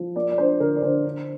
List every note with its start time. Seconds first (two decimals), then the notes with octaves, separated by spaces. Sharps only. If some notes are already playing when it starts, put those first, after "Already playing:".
Already playing: F3
0.15 A#3 D5
0.31 D5
0.38 D4 C5
0.59 D3 A#4
0.76 D5
0.82 D3 C5
1.04 D4